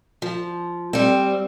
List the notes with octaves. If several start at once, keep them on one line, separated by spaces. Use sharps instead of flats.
F3
G3 C4